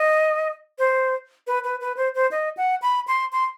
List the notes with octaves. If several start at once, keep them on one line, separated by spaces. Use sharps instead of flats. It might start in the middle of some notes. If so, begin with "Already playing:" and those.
Already playing: D#5
C5
B4
B4
B4
C5
C5
D#5
F#5
B5
C6
C6